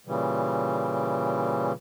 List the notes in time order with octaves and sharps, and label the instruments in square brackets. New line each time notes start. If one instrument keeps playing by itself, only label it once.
[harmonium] A#2 C#3 E3 G3